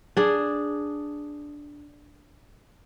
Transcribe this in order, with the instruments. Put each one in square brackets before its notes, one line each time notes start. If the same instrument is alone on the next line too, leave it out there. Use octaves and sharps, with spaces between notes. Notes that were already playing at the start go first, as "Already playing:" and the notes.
[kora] D4 G#4